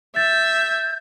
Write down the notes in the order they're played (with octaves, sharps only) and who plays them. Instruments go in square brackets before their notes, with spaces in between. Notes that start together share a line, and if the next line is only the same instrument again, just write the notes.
[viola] E5 [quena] G6 [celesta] A6